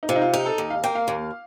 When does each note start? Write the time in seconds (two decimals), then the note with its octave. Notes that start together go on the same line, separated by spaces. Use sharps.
0.03 D#4
0.09 C3 F4
0.16 D#4
0.22 F4
0.33 D#4 G4
0.46 A4
0.58 D#2
0.70 F5
0.84 A#3 G5
0.95 F5
1.08 D#2